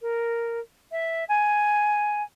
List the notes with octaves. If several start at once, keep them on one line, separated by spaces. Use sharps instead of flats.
A#4
E5
G#5